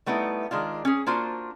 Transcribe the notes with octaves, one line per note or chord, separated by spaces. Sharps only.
G3 A3 B3 D#4 E4
D#3 G#3 D4 F4
C#4 G#4
A#3 D4 F4 F#4 C5